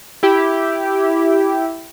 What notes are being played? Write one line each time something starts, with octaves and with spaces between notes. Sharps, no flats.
E4 G4